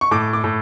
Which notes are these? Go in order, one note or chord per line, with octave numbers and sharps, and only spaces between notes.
C#6
A2 D6
D6
A2